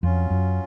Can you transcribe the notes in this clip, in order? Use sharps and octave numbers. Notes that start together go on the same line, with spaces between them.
F2 F#3 C#4 F4
F#2